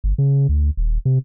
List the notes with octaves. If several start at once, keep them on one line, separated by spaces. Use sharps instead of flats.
G1
C#3
D2
D#1
C3